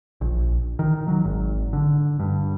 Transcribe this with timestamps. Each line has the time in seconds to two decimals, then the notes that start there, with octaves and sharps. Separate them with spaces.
0.21 A#1
0.79 D#3
1.08 F#3
1.24 G#1
1.73 D3
2.20 G2